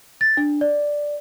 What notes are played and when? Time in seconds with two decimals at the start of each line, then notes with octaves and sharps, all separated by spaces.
0.21 A6
0.37 D4
0.61 D5